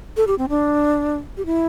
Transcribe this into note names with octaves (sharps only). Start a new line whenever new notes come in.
A4
G4
C4
D4
G4
E4